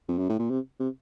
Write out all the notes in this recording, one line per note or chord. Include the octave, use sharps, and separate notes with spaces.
F2
F#2
A2
A#2
C3
C3